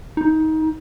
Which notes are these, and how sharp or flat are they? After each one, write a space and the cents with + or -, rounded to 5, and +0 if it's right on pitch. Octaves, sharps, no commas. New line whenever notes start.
D#4 +20